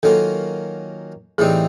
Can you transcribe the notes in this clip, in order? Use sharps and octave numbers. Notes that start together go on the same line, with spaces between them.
D#3 F#3 A#3 C#4 F4 A4
A2 E3 G3 C4 D#4 G#4